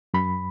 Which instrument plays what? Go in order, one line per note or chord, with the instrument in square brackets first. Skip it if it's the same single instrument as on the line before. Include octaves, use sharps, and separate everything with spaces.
[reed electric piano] F#2 B5